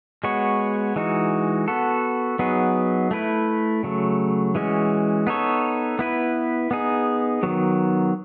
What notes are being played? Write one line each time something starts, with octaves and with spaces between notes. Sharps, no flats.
G#3 B3 F#4 C#5
E3 G#3 D#4 F#4
B3 F#4 A4
F#3 B3 D#4 G#4
A3 E4 B4
C#3 F#3 A3
E3 G#3 C#4 F#4
B3 D#4 A4 C#5
B3 E4 B4
B3 D#4 G#4
D#3 F#3 B3